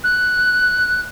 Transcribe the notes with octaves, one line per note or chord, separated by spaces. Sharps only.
F#6